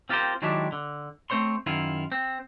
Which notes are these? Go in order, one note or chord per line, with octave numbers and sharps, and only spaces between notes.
C4 F4 G4 G#4 A#4 C5
D#3 F#3 G#3 D4 E4 G4
D3
A3 C4 C5 C#5 C6
F#2 D#3 E4 F4
C4